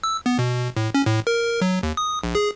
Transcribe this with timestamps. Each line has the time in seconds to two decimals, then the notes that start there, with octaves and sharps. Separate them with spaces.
0.04 E6
0.26 B3
0.39 B2
0.77 A2
0.94 C#4
1.06 A2
1.27 A#4
1.61 F#3
1.83 D#2
1.97 D#6
2.23 A#1
2.35 G#4